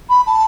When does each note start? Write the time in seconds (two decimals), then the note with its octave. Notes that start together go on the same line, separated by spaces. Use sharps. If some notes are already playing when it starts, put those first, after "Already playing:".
0.09 B5
0.26 A5